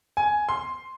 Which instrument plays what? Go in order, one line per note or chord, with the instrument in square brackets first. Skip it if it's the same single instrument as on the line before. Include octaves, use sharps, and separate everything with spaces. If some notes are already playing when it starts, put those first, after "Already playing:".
[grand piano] G#5
C6